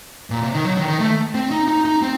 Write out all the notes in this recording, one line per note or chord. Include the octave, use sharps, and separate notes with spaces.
A#2
C3
D#3
F#3
D#3
D#3
A3
C4
D#4
D#4
D#4
C4